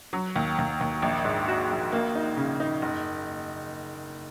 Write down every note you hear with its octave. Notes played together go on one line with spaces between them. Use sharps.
F#3
D#2
D#2
D#2
A#1
G#2
F#4
A#1
A#3
D#4
C#3
D#4
F#1